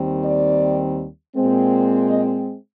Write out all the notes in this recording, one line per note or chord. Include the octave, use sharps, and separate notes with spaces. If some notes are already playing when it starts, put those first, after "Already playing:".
Already playing: D#2 D#3 G3 C4
D5
A#2 G#3 C4
D#5